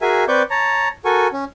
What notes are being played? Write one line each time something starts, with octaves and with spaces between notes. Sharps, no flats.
F#4 G#4 A#4 E5 G#5
C4 B4 D5 C#6 D6 G6
C#5 A5 A#5
F#4 A4 A#4 G#5 C#6
C#4